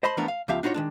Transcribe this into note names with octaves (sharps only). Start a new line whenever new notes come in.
C5 D#5 A5 B5 C6
E3 F3 A3 B3 D4 A#4
F5
C#2 F3 B3 G4 E5 F5
D4 D#4 F4 F#4 C#5
D#3 G#3 D4